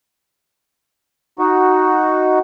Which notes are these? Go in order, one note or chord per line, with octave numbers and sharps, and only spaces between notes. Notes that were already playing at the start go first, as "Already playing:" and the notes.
D#4 F#4